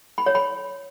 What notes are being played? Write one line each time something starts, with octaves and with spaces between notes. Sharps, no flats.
B5
C#5
B5